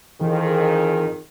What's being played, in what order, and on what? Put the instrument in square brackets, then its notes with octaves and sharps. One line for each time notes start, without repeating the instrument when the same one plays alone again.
[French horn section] F2 D#3 G#4 [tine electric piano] E3